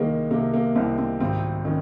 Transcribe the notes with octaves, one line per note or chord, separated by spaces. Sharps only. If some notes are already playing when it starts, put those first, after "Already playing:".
Already playing: C2 D#3 G#3 A#3
C3 A#3
A#3
C2 C4
C4
G#1 C4
D#3 C#4